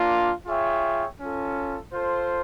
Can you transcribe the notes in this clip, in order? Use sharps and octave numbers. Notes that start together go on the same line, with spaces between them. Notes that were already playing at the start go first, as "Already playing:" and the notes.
Already playing: A#3 D4 F4
F4 G#4 C#5 E5 G5
C#4 F4 A4
F4 A4 C5